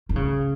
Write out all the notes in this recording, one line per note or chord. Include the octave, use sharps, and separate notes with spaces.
D#3
C#3